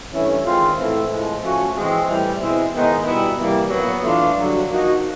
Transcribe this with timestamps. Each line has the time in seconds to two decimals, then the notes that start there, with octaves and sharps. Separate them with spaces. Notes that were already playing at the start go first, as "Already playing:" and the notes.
0.11 G2 E3 A3 C#4 E4
0.44 D#3 G#3 C4 F4
0.77 A2 E3 A3 C4 E4
1.09 A2 F3 G#3
1.42 F3 A3 C#4 F#4
1.74 E3 G#3 C4
2.07 A2 E3 G3
2.39 B2 G#3 C4 E4
2.72 G#2 D#3 G#3 B3 D#4
3.05 B2 G3 B3 E4
3.38 C3 E3 G3 A#3
3.70 A#2 F#3 B3
4.02 E3 A3 D4 F4
4.35 G2 D3 F#3
4.68 F3 A#3 D#4 F#4